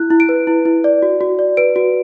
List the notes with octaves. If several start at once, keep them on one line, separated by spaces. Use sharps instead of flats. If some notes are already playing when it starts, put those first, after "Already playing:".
Already playing: E4 F#6
E4
D7
B4
E4
E4
D5
F#4
F#4
D5
B4 D7
F#4